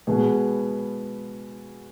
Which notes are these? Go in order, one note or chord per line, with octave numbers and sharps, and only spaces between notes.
B2 G#3 B3 G#4